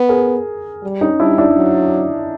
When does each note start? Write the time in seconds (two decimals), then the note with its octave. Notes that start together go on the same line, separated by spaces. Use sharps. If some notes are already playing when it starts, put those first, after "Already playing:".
Already playing: B3
0.09 G#4 A#4
0.83 G3
1.01 C#4 D#4
1.20 G3 D4 E4
1.38 D4 E4
1.56 F#3